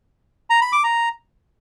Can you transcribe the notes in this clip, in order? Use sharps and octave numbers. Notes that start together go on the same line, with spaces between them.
A#5
B5
D6
A#5